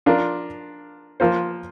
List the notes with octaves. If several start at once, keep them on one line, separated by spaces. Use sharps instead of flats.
F3 D4 F4 A#4
F3 A#3 F4 C5